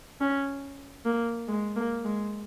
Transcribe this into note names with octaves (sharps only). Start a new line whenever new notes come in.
C#4
A#3
G#3
A#3
G#3